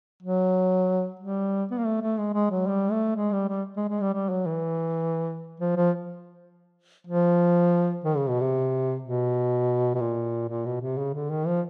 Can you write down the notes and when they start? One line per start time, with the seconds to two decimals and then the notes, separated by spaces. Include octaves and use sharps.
0.23 F#3
1.20 G3
1.71 B3
1.78 A#3
1.86 A3
2.02 A3
2.18 G#3
2.34 G#3
2.51 F#3
2.67 G3
2.91 A3
3.16 G#3
3.32 G3
3.48 G3
3.77 G#3
3.89 G#3
4.01 G3
4.13 G3
4.30 F#3
4.46 E3
5.60 F3
5.76 F3
7.07 F3
8.04 D#3
8.17 C#3
8.29 B2
8.41 C3
9.02 B2
9.95 B2
10.00 A#2
10.48 A#2
10.65 B2
10.81 C3
10.98 C#3
11.14 D3
11.30 D#3
11.47 F3